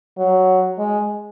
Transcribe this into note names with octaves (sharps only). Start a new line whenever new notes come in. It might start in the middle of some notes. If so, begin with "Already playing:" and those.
F#3
G#3